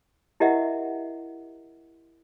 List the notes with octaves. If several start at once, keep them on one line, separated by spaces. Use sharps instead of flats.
E4 G4 A#4 D#5 E5 F#5